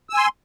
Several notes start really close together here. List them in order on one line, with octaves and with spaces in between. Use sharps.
E6 G#5 C6